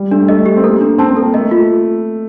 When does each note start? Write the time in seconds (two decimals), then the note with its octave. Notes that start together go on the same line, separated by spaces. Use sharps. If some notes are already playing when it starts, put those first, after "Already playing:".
Already playing: G3
0.11 A3 D4
0.28 A3 D#5
0.46 G4
0.57 C4
0.63 A#3 A4
0.81 D4
0.98 C4 A5
1.10 C4
1.17 A4
1.22 A#3
1.34 A3 D#5
1.51 F4